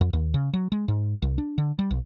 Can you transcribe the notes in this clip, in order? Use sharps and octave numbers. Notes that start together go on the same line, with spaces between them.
F2
D#2
C#3
F#3
G#3
G#2
C2
D4
D3
G3
B1